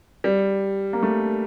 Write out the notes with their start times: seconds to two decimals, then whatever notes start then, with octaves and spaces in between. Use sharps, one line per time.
0.24 G3
0.93 A#3
1.03 A3